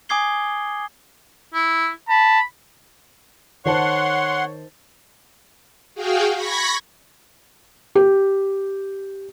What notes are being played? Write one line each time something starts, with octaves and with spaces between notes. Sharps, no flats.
G#5 D6 D#6 G#6 C7 G7
E4
A5 B5
D#3 C5 C#5 F#5 A5 C6
F#4 G#4 F5 G5
B5 C#6 G#6 A#6 B6
G4